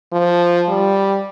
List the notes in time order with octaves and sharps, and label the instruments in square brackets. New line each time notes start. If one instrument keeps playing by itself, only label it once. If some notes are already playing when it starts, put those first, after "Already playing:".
[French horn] F3
G3